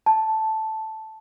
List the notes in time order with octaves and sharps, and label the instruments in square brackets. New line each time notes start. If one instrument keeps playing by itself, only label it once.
[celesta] A5